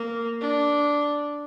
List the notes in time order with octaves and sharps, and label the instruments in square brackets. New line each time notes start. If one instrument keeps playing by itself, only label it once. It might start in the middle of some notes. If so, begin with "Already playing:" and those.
Already playing: [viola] A#3
D4